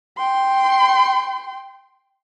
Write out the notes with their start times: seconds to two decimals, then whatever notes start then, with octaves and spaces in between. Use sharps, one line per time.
0.18 G5 C6